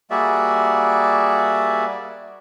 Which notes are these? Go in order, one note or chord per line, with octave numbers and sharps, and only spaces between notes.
G3 A#3 F#4 G#4 D5 E5